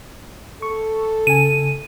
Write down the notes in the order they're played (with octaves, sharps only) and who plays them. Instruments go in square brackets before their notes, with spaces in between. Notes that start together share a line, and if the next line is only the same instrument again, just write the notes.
[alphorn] A4 [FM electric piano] C#6
[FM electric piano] C#3 G#5 [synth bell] D#7